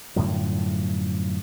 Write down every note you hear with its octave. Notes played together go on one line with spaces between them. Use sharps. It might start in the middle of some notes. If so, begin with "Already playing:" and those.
F#2 A2 D3 F3